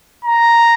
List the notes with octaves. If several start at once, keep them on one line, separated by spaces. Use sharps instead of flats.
A#5